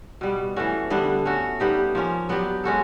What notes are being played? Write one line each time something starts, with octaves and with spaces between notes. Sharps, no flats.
B2 G3 B3
E3 A3 C#4 F#4
D3 G3 B3 D4
A3 C#4 F#4
G3 B3 D#4 G4
F3 A#3 C#4
F#3 B3 D4 G4
G#3 C#4 F#4 A4